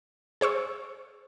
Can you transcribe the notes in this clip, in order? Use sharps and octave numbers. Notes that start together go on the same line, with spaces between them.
G#4 C5 C#6 E6